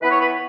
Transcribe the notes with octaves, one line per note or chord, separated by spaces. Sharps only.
E3 B3 E4 B4
C#5
B4